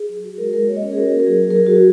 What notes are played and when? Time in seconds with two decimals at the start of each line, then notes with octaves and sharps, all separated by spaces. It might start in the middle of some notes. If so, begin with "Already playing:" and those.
Already playing: G#4
0.09 F#3
0.23 F#4
0.38 G#3 A#4
0.53 G#3 A#4
0.68 A#3 C#5
0.76 D#5
0.82 C#4 C#5
0.93 G#4
0.97 F#4 A#4
1.12 A#3
1.19 A#4
1.26 F#3 G#4
1.42 F#3
1.51 A#4
1.56 F#3 G#4
1.66 F#4
1.71 F#3
1.76 G#4